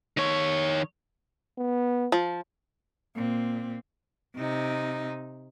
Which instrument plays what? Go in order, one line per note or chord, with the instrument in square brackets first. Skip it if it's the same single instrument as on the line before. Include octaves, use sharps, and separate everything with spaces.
[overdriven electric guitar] D#3 C#5
[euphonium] B3
[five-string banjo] F3
[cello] A#2 C4
C3 D#4